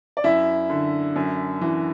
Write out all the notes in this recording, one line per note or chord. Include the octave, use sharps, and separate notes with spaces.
D5
F#2 E4 E5
D3
F#2
E3